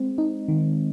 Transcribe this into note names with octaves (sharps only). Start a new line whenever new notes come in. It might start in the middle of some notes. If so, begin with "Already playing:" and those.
Already playing: G#3 C4
D#4
D#3